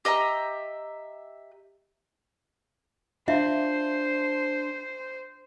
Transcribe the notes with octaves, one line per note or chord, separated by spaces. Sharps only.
G4 D#5 E5 A#5
D4 F4 C5 E5 F5